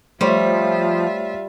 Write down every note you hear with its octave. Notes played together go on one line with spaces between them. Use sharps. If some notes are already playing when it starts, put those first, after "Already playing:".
F3 G3 A3 F4 C5 C#5 E5